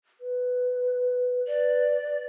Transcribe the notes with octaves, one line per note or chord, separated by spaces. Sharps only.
B4
B4 D5